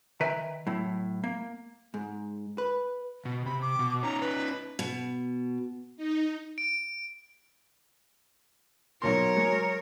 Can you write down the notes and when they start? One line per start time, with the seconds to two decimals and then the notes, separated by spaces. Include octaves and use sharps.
0.21 D#3 B4 E5 G5 G#5 A#5
0.67 A2 F#3 E4
1.24 A#3
1.94 G#2
2.58 B4
3.25 B2
3.46 C3 B5
3.62 D6
3.79 B2
4.03 C#4 D#4 C#5 A#5
4.21 B4
4.79 B2
5.96 D#4
6.58 D7
9.02 B1 B2 A#4 C#5 C6
9.36 F#3 G#3